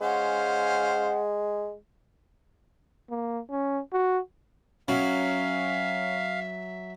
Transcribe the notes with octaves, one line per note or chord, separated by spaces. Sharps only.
G#3 C#4 C5 F5 F#5
A#3
C#4
F#4
F#3 C#4 E5 F5